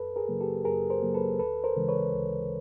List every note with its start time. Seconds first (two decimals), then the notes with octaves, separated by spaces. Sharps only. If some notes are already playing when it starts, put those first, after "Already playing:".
Already playing: F#2 A4 B4
0.16 G#4 A#4
0.28 C#3 F#3 A#3
0.41 G4 A4
0.65 F#2 G#4 A#4
0.90 A#4 C5
1.03 C#3 F#3 A#3
1.14 A4 B4
1.39 D2 A4 B4
1.64 A#4 C5
1.76 C#3 E3 G#3
1.88 B4 C#5
2.14 D2